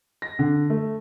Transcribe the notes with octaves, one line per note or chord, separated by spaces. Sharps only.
A#6
D3
A3